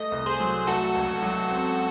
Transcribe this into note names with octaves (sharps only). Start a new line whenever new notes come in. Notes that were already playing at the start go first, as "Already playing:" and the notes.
Already playing: A3 D#5
C2
G#4 C5
F#3
A3 F#4 A4
C#2
F#3
C4